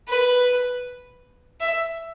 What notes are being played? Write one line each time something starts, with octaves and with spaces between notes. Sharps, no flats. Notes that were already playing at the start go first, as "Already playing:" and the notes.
B4
E5